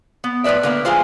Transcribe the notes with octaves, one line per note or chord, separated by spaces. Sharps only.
B3
A2 F3 B4 D5 E5
D3 A#3 B3
E3 G#3 A#3 F4 G#4 C5